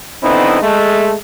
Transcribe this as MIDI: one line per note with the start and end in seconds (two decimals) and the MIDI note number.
0.23 0.60 50
0.23 0.60 52
0.23 0.60 59
0.23 0.60 60
0.23 0.60 63
0.23 0.60 64
0.62 1.14 56
0.62 1.14 57